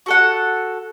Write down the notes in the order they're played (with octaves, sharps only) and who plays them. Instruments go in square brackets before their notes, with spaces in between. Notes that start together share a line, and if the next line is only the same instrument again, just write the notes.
[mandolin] F#4 A4 F#5